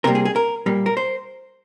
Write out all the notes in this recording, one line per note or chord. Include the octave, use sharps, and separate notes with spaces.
C3 G3 A#3 A#4
G#4
G#4
A#4
A#2 G3 A#3
A#4
C5